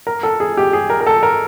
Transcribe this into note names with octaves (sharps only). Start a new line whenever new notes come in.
A#4
A4
G#4
G4
G#4
A#4
A#4
A4
A#4